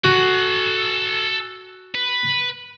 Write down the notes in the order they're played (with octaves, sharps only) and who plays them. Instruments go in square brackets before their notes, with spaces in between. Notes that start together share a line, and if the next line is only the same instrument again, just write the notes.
[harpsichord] F#4 F#5 [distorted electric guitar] A4 G#5
[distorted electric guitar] B4